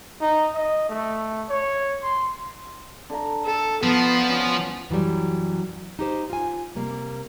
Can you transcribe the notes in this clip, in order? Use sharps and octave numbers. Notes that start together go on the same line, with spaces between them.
D#4
D#5
A3
C#5
C6
D3 A#5
A4
F3 B3
C#4 F#4
F#2 E3 F#3 G3
D#4 G4 C5
F4 G#5
C3 G3 A#3